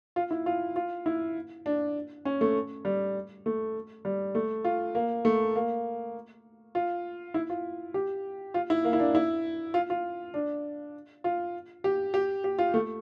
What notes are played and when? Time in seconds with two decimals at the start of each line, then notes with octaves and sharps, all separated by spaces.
0.16 F4
0.31 E4
0.46 F4
0.76 F4
1.06 E4
1.66 D4
2.25 C#4
2.41 A3
2.85 G3
3.46 A3
4.05 G3
4.35 A3
4.64 F4
4.95 A#3
5.25 A3
5.56 A#3
6.75 F4
7.34 E4
7.50 F4
7.94 G4
8.54 F4
8.70 E4
8.85 A#3
8.93 E4
9.00 D4
9.15 E4
9.74 F4
9.90 F4
10.34 D4
11.24 F4
11.84 G4
12.14 G4
12.44 G4
12.59 F4
12.74 A3